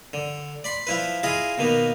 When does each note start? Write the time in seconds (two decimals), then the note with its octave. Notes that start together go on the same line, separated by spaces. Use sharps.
0.13 D3
0.64 D5 B5 C6
0.87 F3 E4 B4
1.23 E4 F4 G#4 D#5
1.58 B2 D#3 A#3 B3